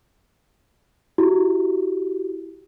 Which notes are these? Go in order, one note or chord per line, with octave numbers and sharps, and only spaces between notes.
E4 F#4 G4